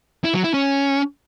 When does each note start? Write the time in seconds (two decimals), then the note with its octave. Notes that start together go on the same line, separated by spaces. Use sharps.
0.24 E4
0.34 F#3
0.44 E4
0.54 C#4